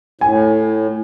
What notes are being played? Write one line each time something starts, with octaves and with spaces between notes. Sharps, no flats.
A2 G#5